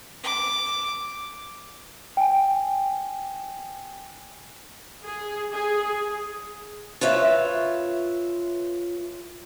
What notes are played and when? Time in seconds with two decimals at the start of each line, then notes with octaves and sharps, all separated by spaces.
0.23 D6
2.17 G5 G#5
5.04 G#4
5.52 G#4
7.01 F4 B4 C#5 E5